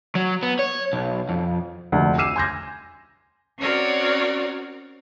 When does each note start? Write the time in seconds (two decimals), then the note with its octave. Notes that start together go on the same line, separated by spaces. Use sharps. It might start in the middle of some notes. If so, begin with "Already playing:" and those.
0.15 F#3
0.43 B3
0.59 C#5
0.93 B1
1.29 F2
1.92 F1 D2
2.18 D6 E6 F6 C7 D#7 E7
2.36 G#5 C6 D6 G6 G#6 A#6
3.58 C4 C#4 F#4 A#4 C#5 D5